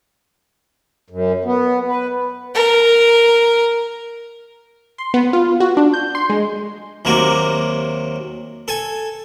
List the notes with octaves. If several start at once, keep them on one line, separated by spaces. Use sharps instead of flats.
F#2
B3
B4
A#4
C6
B3
F4
F#4
D4
G6
C6
G#3
D#2 C3 F#3 A#3
A4 G#5